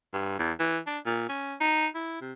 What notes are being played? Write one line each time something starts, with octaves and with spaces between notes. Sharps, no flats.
G2
E2
E3
D4
A#2
C#4
D#4
E4
C3